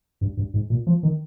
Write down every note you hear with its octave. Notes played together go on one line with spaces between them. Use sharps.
G2
G2
G#2
A#2
F3
D#3